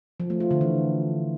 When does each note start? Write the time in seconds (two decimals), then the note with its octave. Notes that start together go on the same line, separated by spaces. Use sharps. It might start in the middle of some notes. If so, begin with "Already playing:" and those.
0.20 F3
0.30 A3
0.40 F4
0.51 D3
0.61 E3